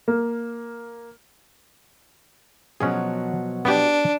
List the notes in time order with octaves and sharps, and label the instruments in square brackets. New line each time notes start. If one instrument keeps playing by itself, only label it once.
[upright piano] A#3
[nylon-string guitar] B2 F3 F#3 [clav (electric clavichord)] C#4 G#4
[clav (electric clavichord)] B3 G4 [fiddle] D4